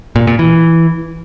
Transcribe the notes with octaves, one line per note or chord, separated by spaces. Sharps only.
A#2
A#2
E3